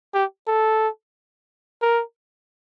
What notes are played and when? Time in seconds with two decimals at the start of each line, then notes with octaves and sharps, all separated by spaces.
0.14 G4
0.48 A4
1.82 A#4